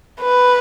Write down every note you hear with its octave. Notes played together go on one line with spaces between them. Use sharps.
B4